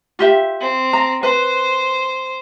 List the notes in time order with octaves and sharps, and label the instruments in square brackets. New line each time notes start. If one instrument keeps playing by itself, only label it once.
[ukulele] F4 G4 E5
[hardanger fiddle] C4
[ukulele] A#5
[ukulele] B4 [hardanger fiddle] C5